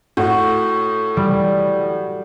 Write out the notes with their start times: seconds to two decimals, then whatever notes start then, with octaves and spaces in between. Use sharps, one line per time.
0.17 A2 F#4 F#5
1.17 G3